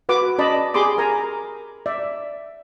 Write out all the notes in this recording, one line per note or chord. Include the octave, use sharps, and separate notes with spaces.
F#4 B4 F#5 D6
C#4 D5 D#5 A5 B5
G4 G#4 B5 C6 D6 D#6
A#4 G#5 A#5
D5 E5